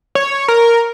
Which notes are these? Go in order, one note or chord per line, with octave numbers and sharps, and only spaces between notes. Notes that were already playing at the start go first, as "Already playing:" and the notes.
C#5
A#4